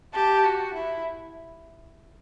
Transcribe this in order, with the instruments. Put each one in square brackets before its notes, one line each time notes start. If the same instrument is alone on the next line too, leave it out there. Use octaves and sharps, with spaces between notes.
[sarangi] G4 [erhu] A5
[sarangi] F#4
E4